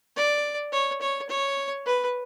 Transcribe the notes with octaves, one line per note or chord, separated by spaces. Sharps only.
D5
C#5
C#5
C#5
B4